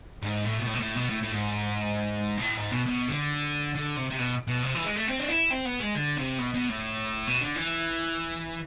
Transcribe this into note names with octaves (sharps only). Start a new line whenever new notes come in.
G#2
A2
B2
A2
B2
A2
B2
A2
A2
G#2
B2
A2
G#2
B2
B2
D3
D3
C3
C3
B2
B2
C3
E3
G#3
A3
C4
D4
E4
C4
B3
G#3
D3
C3
B2
B2
A2
B2
D3
E3